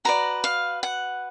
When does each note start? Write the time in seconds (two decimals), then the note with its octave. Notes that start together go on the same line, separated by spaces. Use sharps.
0.05 F#4 B4 D5 A#5
0.44 F5
0.83 F#5